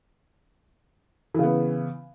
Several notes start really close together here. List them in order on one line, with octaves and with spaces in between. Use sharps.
E3 C#3 B3